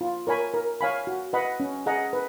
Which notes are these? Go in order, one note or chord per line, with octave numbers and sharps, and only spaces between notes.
F4
A#4 C#5 G#5 B5
A#4
C#5 F5 G#5 B5
F#4
B4 D#5 F#5 B5
C#4
G#4 D#5 F#5 A#5
B4